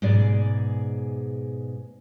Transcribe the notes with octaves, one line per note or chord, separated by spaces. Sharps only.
G#2 B2 G#3 G#4 D5